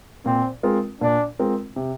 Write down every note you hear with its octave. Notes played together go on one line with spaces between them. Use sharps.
A#2 C4
G#3 C4 F4 A#4
A#2 D4
G#3 C4 F4 A#4
C3